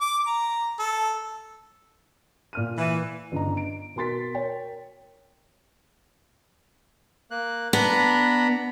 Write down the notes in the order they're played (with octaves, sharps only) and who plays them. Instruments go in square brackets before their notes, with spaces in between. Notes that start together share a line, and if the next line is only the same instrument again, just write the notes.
[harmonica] D6
A#5
A4
[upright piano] A#2 F6 D#7
[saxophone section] E3
[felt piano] G1 C#3 D4 D#5 A#5
D7
B2 A#4 C6 A6 B6
A#4 C#5 G5
[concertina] A#3 F#6
[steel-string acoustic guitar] B3 [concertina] D4 A#5 B5